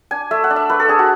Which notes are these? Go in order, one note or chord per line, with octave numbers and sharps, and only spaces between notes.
D4 G#5
A3 E5
F#5
D4
E5
A3 B4
A4
D4 G#4
F#4